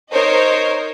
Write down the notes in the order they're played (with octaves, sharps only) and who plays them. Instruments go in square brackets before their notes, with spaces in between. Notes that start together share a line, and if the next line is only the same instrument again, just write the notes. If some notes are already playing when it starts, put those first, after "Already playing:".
[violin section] D#4 A#4 C5 C#5 D#5